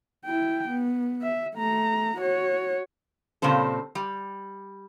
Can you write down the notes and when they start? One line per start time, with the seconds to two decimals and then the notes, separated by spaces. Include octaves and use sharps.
0.25 E4 G5
0.69 B3
1.22 E5
1.56 A3 A#5
2.17 F#4 C#5
3.42 A#2 C#3 G3 C4 A4
3.95 G3